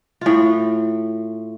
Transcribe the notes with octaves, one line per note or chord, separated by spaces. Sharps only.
A2 F4